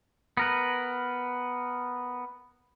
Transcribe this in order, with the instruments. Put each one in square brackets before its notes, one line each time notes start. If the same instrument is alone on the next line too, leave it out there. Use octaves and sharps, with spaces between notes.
[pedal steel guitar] B3 A#4 B4